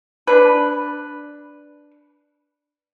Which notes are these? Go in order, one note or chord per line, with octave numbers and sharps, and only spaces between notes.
D4 B4